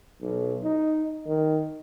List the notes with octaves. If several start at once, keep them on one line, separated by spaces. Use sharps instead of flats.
B1
D#4
D#3